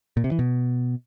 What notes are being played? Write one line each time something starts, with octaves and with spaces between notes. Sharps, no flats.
A#2
C3
E3
B2